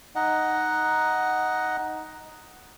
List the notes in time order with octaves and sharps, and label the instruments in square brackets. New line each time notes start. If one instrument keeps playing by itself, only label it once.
[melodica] D#4 D#5 F#5